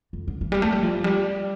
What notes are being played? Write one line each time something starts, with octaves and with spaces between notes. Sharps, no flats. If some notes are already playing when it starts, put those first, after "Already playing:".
F2
D3
E3
G3
A3
G3
F3
G3